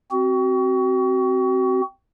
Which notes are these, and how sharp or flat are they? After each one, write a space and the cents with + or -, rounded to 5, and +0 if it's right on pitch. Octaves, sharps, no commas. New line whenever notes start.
C4 +0 F#4 +30